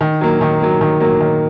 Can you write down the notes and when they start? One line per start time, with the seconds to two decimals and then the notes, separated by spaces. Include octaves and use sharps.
0.01 D#3
0.21 F#3 A#3
0.41 D#3
0.60 F#3 A#3
0.81 D#3
1.00 F#3 A#3
1.20 D#3